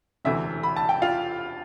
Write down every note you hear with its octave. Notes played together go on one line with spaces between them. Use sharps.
E1 D2 C3 E3 A3 E5
B5
A5
G5
F4 F5